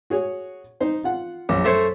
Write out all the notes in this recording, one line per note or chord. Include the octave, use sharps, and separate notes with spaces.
F#4 G#4 C#5
D#4 C5
F4 F#5
A#1 F#2
A3 C5 C#5